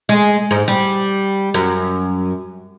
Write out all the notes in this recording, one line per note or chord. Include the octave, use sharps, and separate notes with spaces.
G#3
G#2
G3
F#2